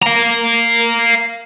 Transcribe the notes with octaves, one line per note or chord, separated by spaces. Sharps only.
F5 A#5